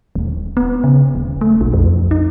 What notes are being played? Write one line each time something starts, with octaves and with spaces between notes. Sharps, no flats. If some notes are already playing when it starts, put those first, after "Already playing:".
D#1
B3
C#3
D#1
A3
B1
F2
D#4